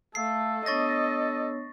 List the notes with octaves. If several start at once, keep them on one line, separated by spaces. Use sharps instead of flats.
A3 A4 F5 A5 E6 C7
B3 D4 C#5 D#5 C#6 A6 A#6